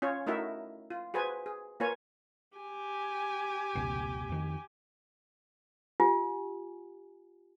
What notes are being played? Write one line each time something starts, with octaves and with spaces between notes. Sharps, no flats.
C#4 F4 C#5
A3 D#4 E4 F#4 A#4 E5
F4
F#4 G#4 B4 C5 G#5
G#4
A#3 F4 B4 C#5 G#5
G4 G#5
F1 C#2 B2
F2 D#3
F4 G4 F#5 G#5